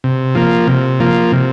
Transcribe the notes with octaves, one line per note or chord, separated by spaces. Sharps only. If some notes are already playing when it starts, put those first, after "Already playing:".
C3
F3 A#3
C3
F3 A#3
C3